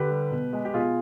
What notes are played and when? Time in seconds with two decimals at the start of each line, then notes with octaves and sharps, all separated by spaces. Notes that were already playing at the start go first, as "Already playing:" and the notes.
Already playing: D3 G4 B4
0.10 G3
0.31 B2
0.53 G#3
0.65 G4
0.74 B2 F4 G#4